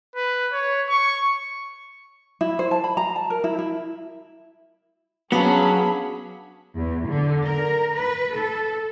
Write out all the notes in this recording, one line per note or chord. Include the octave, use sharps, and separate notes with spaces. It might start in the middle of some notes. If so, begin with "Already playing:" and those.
B4
C#5
C#6
E4
C5
A5
B5
A#5
A5
A#4
E4
E4
F#3 B3 C#4 D4 G#4 F5 A5 B5
E2
D3
A#4
B4
A4